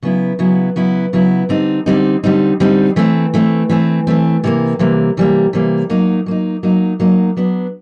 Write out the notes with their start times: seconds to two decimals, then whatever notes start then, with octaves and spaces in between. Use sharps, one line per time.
0.02 C#3 F#3 B3 E4
0.39 C#3 F#3 B3 E4
0.76 C#3 F#3 B3 E4
1.13 C#3 F#3 B3 E4
1.49 D3 G3 C4 D#4
1.86 D3 G3 C4 D#4
2.23 D3 G3 C4 D#4
2.60 D3 G3 C4 D#4
2.96 E3 A3 C4
3.34 E3 A3 C4
3.69 E3 A3 C4
4.07 E3 A3 C4
4.44 C3 E3 G3 A#3
4.79 C3 E3 G3 A#3
5.17 C3 E3 G3 A#3
5.53 C3 E3 G3 A#3
5.90 F#3 A#3 D#4
6.26 F#3 A#3 D#4
6.63 F#3 A#3 D#4
7.00 F#3 A#3 D#4
7.37 F#3 B3 D4